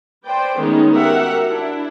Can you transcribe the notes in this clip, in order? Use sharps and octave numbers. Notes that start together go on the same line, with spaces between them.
B4 C5 D5 G5
D#3 G#3 A3 B3 C#4 D#4
F#4 G4 A#4 E5 F#5
D4 E4